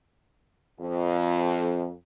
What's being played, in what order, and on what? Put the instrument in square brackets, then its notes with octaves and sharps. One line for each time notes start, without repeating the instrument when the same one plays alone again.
[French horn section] F2